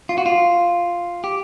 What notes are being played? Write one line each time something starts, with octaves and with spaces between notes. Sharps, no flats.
F4
F#4
F4
G4